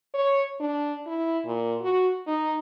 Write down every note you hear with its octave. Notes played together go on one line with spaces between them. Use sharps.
C#5
D4
E4
A#2
F#4
D#4